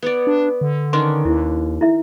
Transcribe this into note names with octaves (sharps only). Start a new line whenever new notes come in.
B3 C#5 D5
D4
D3
D#3 C#4 D4 C6
D#2 E4
E4 E5